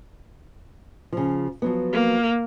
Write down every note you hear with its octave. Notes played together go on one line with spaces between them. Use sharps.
C#3 F3
F3 F#3 B3
A#3